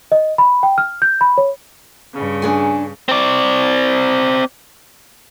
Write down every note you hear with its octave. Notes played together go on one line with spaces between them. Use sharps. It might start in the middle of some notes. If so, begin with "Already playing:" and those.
D#5
B5
G5
F6
G6
B5
C#5
G2 C#3
D4 G#4 G#5
C4 D5